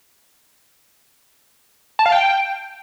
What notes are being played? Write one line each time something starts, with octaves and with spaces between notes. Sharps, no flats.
A5
F5
G5